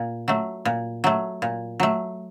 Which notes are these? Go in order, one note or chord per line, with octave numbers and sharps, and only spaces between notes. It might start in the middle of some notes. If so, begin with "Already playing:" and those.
Already playing: A#2
F#3 A3
A#2
F#3 A3
A#2
F#3 A3